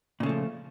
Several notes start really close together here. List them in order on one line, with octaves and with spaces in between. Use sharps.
A#2 C#3 A3 F3